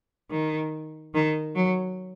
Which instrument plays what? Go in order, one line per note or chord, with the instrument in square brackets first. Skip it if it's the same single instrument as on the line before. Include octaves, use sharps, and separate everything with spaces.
[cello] D#3
D#3
F#3